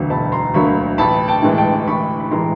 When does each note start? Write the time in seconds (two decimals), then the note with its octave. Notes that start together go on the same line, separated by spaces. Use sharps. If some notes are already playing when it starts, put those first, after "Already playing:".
Already playing: E1 D2 D3 F#3 A#3
0.10 E1 A5 B5
0.32 A#5 C6
0.54 D2 D3 F#3 A#3 B5 C#6
0.98 A1 A5 B5
1.28 G5 A5
1.42 A2 E3 G#3
1.58 G5 A5
1.87 A1 B5 C#6
2.20 B5
2.31 A2 E3 G#3 A#5 C6